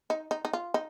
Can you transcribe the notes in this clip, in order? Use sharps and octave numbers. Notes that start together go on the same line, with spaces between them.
D#4
D#4
D#4
F4
D#4